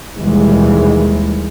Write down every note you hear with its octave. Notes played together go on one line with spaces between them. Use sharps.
D#2 B2 D#3 E3 G3 G#3